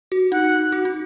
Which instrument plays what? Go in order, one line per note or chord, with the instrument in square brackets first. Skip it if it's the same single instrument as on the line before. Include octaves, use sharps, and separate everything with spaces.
[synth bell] F#4
[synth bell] D#4 [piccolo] F#5
[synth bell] F#4
D#4